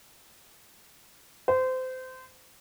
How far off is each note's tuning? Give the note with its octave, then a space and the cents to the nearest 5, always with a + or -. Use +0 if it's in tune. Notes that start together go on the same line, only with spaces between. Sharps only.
C5 -25